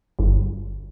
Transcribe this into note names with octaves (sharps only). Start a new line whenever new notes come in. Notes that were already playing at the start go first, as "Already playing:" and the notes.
G1